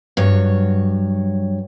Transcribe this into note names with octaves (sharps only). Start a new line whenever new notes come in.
G2 F#3 C#5